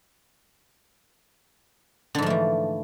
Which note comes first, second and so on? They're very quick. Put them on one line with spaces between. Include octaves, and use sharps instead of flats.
D3 G#2 F3 A3 E3